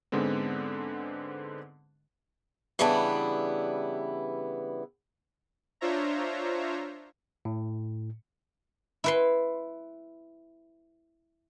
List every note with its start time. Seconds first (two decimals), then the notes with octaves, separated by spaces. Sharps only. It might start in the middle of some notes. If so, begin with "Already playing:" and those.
0.12 G#2 D3 G#3 B3 C4
2.79 C#3 E3 G3 B3 D4 E4
5.81 D4 F4 C5 C#5 E5 A#5
7.45 A2
9.04 E4 B4 C6